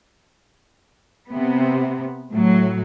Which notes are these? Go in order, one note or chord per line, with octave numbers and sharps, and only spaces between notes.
C3 B3
A2 F#3